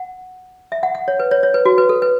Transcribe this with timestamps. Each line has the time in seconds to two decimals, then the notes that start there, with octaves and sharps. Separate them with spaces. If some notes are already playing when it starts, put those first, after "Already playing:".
Already playing: F#5
0.72 E5
0.83 F#5
0.95 F#5
1.08 C#5
1.20 B4
1.31 C#5
1.43 C#5
1.54 B4
1.65 F#4
1.78 B4
1.89 A4
2.02 B4